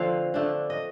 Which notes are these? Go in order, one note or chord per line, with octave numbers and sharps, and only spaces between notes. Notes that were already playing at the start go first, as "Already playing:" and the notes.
Already playing: D3 F3 A3 C4 F5
D3 A3 D4
D#5